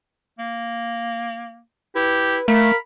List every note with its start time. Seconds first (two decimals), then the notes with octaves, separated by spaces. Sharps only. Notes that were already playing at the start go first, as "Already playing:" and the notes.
0.39 A#3
1.96 E4 G4 B4
2.48 A3 A#4 F5 B5